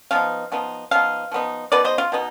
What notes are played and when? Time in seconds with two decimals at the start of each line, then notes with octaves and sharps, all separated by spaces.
0.11 F3 B3 D#4 F5
0.52 F3 B3 D#4
0.91 F3 B3 D#4 F5
1.32 F3 B3 D#4
1.72 B2 B3 D#4 B4 D5
1.85 C5 D#5
1.98 F4
2.12 B2 B3 D#4